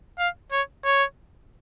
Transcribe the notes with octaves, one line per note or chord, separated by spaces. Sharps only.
F5
C#5
C#5